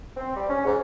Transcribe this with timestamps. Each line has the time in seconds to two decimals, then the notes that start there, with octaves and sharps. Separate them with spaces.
0.17 C4
0.35 G3
0.49 C#4
0.65 G#2